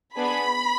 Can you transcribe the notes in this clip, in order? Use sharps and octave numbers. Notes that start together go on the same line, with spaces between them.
B3 D4 G#4 B5